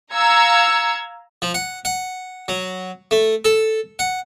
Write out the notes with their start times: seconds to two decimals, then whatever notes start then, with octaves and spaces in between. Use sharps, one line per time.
0.12 F5 A#5 E6 G#6 C#7
1.42 F3
1.54 F#5
1.85 F#5
2.48 F#3
3.11 A3
3.45 A4
3.99 F#5